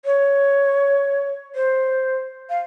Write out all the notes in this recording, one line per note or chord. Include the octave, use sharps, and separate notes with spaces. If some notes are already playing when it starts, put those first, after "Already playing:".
C#5
C5
F5